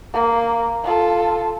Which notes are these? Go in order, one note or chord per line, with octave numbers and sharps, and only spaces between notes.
A#3
F4 A4